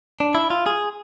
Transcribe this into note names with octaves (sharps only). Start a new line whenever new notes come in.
D4
E4
F4
G#4